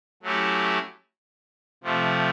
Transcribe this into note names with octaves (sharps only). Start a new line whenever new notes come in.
F#3 A3 C#4 E4 G4
C3 F3 A3